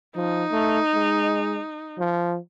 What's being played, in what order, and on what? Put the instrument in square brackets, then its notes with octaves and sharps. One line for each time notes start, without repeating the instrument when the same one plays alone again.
[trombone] F3 [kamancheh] D#4
[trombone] A3
G#3
F3